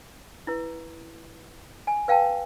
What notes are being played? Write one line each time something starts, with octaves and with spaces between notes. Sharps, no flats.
E4 B4
G#5
B4 F5 G5 A5